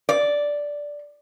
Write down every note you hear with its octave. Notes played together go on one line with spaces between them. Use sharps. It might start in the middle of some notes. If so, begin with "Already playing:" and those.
D5